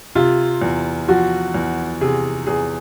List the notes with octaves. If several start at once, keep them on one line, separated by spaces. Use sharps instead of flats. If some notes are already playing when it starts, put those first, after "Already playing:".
C3 F4
E2
F3 F#4
E2
C3 G#4
E2 G#4